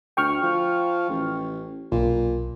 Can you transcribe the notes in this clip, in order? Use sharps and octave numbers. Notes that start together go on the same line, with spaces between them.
D2 G5 C#6 F6
F3
A1
B1 A#2